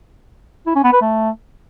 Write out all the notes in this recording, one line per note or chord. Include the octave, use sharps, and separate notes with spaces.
E4
C#4
B3
B4
A3